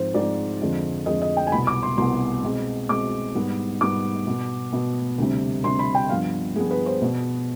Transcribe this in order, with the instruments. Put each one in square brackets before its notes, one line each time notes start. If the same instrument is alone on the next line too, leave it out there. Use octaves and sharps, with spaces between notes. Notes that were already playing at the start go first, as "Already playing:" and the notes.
Already playing: [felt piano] G#2 F3 C4 C5
G#2 F3 C4 D5
F2 D3 G#3 C4
F2 D3 G#3 C4 D#5
D#5
G5
G#5
C2 B2 B3 B5
D6
C6
C2 B2 B3 C6
B2 G#3 C4
B2 G#3 C4 D6
G#2 G3 B3
G#2 G3 B3 D6
B2 B3
B2 B3
D2 C3 G3 C4
D2 C3 G3 C4 C6
B5
G5
G2 F3 B3 F5
G2 F3 B3 G#4
B4
C5
B2 B3